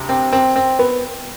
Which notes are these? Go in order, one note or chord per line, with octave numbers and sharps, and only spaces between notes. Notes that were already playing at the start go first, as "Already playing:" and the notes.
Already playing: D2 C3
C4
C4
C4
B3